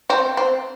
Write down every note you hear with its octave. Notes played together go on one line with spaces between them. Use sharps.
C4
C4